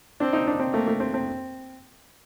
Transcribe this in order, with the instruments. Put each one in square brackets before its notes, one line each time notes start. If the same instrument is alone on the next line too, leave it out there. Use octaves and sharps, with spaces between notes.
[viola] C4 [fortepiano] D4
[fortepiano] D#4
D4
C4
[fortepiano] A3 [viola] A#3
[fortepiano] A3
C4
C4